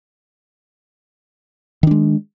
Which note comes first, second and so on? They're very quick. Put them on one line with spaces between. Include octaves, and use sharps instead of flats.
D#3 D4 G#3